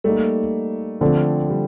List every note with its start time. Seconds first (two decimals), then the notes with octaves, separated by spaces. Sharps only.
0.04 G3 A3 A#3 D#4
1.01 D3 F3 A3 C4
1.50 G3